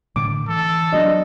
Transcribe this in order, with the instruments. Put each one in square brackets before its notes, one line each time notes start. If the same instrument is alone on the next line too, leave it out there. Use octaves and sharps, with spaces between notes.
[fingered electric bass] A2 D3 [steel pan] D6
[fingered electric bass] E3 [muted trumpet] A4
[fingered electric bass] F3 F#3 B3 [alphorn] D4 [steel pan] D#5